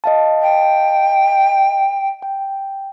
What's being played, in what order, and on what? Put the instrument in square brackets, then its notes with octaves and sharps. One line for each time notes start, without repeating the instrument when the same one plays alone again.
[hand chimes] D#5 F5 A5
[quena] G5
[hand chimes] G5